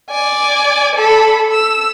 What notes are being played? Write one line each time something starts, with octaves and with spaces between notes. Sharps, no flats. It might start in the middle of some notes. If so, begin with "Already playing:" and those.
D5 G#5
A4 B5
E6